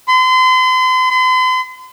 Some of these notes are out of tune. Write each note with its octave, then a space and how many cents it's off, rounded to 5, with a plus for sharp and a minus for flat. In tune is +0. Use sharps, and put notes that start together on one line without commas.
C6 -40
C6 -45